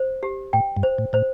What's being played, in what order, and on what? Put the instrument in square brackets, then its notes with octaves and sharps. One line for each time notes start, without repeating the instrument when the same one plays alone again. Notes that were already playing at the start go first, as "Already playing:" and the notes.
Already playing: [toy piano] C5
G4
[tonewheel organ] A2 [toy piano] G5
[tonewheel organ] G2
[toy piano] C5
[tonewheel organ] A2
[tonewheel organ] A2 [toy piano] C5